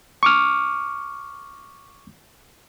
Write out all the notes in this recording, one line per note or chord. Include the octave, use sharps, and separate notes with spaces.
C#6 D6 F6